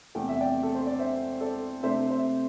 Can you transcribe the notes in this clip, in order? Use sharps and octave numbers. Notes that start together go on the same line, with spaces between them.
E2 C3 A3 G5
E5
D5 G5
A4
C5
D5
C5 E5
A4 D5
C3 A3 D4 C5 E5
C5 E5